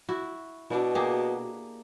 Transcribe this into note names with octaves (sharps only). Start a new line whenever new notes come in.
E4 F#4
B2 D4 E4 F#4
A#3 G4 G#4